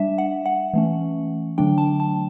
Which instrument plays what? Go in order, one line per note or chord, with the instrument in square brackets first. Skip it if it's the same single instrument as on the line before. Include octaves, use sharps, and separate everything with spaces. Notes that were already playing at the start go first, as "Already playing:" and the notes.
Already playing: [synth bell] G3 D4 E5
F#5
F#5
E3 A3 C#4
D3 F#3 A3 D4 G5
A5
A5